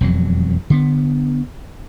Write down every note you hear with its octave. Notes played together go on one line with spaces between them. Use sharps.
E1 F2 F#3
D3 B3